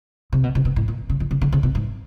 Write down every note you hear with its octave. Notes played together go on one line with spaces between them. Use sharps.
C3
B2
C3
B2
A2
A#2
C#3
D3
C#3
D3
C#3
B2
G#2